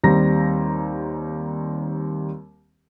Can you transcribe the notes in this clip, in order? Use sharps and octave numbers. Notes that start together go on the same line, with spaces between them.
D#2 G3 C4 A#5 A#6